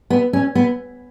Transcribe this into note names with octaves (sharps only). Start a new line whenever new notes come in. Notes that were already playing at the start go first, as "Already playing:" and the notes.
B3
C#4
B3